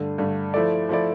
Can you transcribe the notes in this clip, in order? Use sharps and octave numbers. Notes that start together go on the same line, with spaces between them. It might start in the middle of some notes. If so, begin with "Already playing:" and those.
Already playing: G2 D3 A3
G2 D3 A3
F3 A3 E4 A4 D5
F3 A3 E4 A4 D5